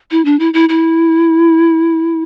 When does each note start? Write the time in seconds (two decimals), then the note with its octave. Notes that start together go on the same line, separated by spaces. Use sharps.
0.11 E4
0.25 D4
0.40 E4
0.54 E4
0.69 E4